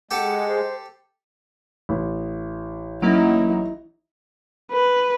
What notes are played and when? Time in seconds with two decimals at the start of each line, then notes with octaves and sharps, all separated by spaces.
0.11 G#3 G4 A4 F#5 A5
0.48 C5
1.89 A1
3.02 F#3 A#3 C#4 D#4 E4
4.72 B4